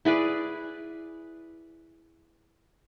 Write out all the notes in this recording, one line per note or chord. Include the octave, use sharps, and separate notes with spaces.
E4 G#4 B4 D5